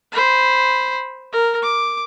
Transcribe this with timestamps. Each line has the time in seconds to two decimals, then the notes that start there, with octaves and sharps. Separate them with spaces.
0.12 C5 B5
1.33 A#4
1.62 D6